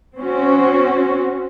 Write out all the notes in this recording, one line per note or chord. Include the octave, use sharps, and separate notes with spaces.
C4 C#4 F#4